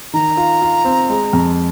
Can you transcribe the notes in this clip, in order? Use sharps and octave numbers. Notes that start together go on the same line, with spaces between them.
D#3 A#5
F4
F4
C4
G#3
F2